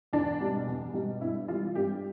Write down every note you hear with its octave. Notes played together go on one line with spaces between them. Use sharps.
E2 D4
B2 G3
E2
B2 G3
G2 E4
E3 G3 F4
G2 G4